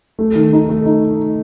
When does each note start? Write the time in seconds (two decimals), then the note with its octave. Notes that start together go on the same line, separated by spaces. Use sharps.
0.19 A3
0.35 D#3
0.53 D#4
0.69 A3
0.86 D#4